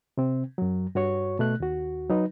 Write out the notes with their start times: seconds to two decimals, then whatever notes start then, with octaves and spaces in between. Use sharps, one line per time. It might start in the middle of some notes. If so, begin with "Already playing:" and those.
0.17 C3 C4
0.58 F#2 F#3
0.95 G2 F#4 C#5 C#6
1.39 B2 A3 F#6
1.60 D#2 F#4
2.10 F#3 D#4 B4